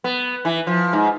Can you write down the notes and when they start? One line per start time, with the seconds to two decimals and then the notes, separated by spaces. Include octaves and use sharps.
0.04 B3
0.45 E3
0.67 F3
0.93 G#2